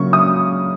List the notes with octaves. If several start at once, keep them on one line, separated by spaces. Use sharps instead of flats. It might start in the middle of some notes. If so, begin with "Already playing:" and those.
Already playing: C#3 F#3 A#3 C#6
D#6